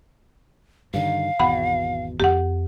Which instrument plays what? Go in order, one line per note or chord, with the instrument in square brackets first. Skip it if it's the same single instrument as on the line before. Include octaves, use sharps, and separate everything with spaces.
[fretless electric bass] G2 D3 D#3 [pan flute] F5
[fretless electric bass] G#1 E2 B2 [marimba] F#5 B5
[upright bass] F2 C4 [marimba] G4 F#5